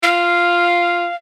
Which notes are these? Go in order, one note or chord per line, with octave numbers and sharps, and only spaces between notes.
F4 F5